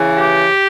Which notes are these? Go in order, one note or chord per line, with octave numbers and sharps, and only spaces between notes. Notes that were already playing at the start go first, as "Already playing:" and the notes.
Already playing: C#3 E3
G4